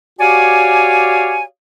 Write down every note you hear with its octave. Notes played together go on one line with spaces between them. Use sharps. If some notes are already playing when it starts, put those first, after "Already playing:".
F#4 G4 C#5 D5 F5 G#5